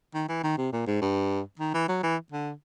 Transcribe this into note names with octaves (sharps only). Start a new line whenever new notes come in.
D#3
E3
D#3
C3
A#2
G#2
G2
D#3
E3
F#3
E3
D3